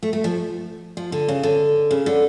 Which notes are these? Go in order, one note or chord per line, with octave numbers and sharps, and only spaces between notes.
A3
A3
F3
F3
D3
C#3
D3
C#3
D3